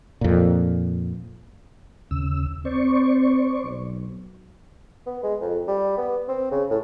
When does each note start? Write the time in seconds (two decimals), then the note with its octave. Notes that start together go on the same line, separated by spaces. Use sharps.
0.21 F2 A#2
2.11 D#2 C#3 E6
2.65 C4 C5 D5 C#6
3.64 B1
5.06 B3
5.23 G#3
5.41 F2
5.68 G3
5.97 B3
6.28 C4
6.51 C#3
6.70 A2